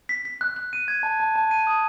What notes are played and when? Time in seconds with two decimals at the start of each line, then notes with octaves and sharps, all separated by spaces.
0.09 B6
0.25 B6
0.41 F#6
0.56 F#6
0.73 D#7
0.88 G#6
1.03 A5
1.20 A5
1.36 A5
1.51 D#7
1.67 D#6